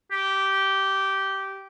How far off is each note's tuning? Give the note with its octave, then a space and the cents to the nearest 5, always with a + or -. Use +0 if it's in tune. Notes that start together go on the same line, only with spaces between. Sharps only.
G4 -15